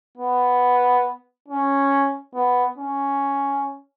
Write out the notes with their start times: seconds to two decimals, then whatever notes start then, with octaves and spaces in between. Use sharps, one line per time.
0.18 B3
1.48 C#4
2.35 B3
2.78 C#4